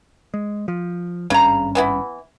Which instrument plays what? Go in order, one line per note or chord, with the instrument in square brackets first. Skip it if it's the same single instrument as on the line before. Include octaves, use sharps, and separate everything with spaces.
[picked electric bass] G#3
F3
[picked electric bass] G#1 G2 C#4 [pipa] C#3 A#5
[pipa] E3 B3 E4